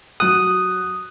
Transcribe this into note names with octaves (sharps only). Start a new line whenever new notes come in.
F#3 D#6 F#6